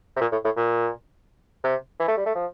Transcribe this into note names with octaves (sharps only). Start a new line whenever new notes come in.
C3
A#2
A2
A2
A#2
C3
E3
A3
G3
A3
F3